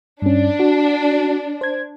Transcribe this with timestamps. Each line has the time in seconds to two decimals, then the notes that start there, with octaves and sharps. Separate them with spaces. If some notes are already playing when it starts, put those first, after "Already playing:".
0.22 G2 C#4 D4
0.59 F#4
1.61 C5 G#6